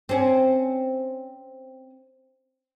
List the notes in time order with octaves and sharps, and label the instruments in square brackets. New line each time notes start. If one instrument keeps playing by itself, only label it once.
[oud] C4 C#4